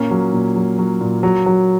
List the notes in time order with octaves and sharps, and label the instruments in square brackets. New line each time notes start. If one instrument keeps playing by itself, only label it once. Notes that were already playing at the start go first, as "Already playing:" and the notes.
Already playing: [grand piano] A#2 A#3 C#4
F#3
A#2
F#3
F#3
A#2
F#3
F#3